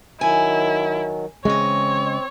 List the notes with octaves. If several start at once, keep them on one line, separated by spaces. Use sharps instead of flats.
D#3 F#3 E4 G#5
C#3 E3 G#3 C4 C#5 D#5